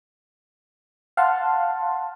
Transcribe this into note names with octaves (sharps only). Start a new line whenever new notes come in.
F5 F#5 A5 C6